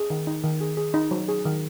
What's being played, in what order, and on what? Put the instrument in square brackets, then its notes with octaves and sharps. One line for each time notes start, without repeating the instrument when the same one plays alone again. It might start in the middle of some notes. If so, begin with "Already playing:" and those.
Already playing: [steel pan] G#4
D#3
D#4
D#3
G#4
G#4
D#4
F#3
G#4
D#3